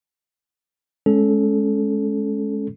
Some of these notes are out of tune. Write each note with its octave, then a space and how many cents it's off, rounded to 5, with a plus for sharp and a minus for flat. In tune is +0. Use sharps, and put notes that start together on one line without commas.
G#3 +25 C#4 +0 A4 -15